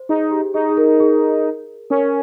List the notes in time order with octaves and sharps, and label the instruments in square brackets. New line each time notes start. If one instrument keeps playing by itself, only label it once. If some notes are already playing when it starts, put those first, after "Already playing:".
Already playing: [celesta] C5
[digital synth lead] D#4 [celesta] G#4
[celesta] G4
[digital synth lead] D#4 [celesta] G#4
[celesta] G#4
A#4
G#4
[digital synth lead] C#4 [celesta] A#4